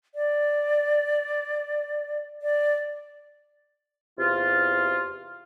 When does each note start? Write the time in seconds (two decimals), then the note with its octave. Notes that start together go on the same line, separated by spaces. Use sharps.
0.15 D5
2.42 D5
4.19 E2 C3 F4